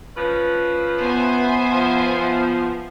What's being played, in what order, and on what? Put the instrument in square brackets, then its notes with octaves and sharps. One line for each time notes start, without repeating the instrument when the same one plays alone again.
[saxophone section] F3 C#4 B4
[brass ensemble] B3 [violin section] C5 E5 G#5
[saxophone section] F3